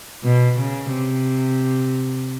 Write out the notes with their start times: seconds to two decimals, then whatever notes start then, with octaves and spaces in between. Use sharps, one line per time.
0.24 B2
0.59 C#3
0.94 C3